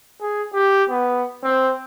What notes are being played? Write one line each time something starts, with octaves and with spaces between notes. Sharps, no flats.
G#4
G4
B3
C4